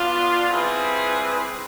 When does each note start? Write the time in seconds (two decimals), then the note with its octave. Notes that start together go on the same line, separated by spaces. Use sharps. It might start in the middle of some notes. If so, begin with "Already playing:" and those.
Already playing: B3 D4 F4
0.49 G3 C4 E4 G#4 B4